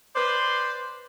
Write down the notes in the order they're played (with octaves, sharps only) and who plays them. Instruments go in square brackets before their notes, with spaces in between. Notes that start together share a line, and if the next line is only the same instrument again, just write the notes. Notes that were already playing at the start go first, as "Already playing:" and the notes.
[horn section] B4 C5 D5 C6